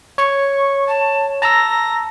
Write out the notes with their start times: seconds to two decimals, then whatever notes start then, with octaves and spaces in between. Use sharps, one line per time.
0.18 C#5 C#6
0.87 A5
1.42 A5 A#5 E6 A#6